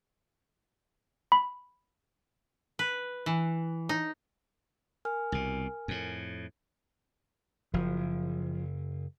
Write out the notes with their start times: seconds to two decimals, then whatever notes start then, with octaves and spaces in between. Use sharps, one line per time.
1.32 B5
2.79 B4
3.26 E3
3.89 D#4
5.05 A#4 G#5 F6
5.32 C2 B2
5.88 F2 A2
7.74 F#1 F3